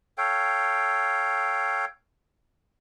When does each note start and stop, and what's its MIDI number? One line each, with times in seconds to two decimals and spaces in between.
0.18 1.85 69
0.18 1.85 73
0.18 1.85 77
0.18 1.85 79